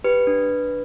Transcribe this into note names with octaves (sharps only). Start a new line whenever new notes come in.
G4 B4
D4